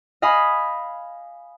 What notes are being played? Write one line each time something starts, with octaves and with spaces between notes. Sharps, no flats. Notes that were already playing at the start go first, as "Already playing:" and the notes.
D#5 F5 G#5 B5 D#6